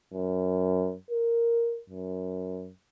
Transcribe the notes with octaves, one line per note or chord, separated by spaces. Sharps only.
F#2
A#4
F#2